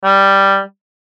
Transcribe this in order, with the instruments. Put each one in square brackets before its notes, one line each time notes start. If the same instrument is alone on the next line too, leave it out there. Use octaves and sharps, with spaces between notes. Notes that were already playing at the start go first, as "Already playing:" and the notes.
[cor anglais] G3